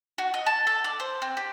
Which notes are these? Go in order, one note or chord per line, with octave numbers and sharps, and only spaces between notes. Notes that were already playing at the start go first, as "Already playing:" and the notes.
F#4
D#5
A5
A4
D5
C5
C4
G4